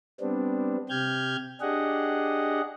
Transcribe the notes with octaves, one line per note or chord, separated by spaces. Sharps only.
G3 B3 C4 D4
C3 G4 F6 G6 G#6
D4 G4 G#4 D#5 F#5